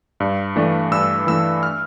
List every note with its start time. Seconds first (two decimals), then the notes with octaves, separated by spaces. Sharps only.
0.20 G2
0.56 E3 A3 D4
0.91 G2 E6
1.27 E3 A3 D4 E6
1.63 F6